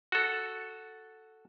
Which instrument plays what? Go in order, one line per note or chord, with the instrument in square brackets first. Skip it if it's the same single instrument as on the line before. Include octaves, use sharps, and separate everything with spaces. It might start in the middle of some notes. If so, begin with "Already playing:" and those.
[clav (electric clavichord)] F#4 A4